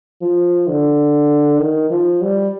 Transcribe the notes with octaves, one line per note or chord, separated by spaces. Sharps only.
F3
D3
D#3
F3
G3